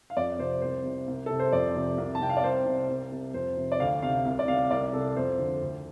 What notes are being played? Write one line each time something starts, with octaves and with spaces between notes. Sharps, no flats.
F5
F2 D5
C3 C5
C2 C5
C3
C2
C3 A4
C5
F2 D5
C3
C2
A5
C3 G5
F5
D5
C2 C5
C3
C2
C3
F2 C5
C3
D5
D2 F5
C3 F5
C2
D5
C3 F5
C2 D5
C3 A4
F2 C5
D3
D2